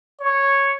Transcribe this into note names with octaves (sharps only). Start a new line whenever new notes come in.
C#5